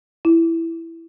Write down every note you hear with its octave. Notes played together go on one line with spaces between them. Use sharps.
E4